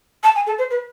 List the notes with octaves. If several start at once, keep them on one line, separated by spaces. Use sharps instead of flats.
A5
G#5
A4
C5
B4